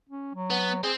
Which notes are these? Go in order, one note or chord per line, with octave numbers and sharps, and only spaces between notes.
C#4
F#3
B3
C4 G#4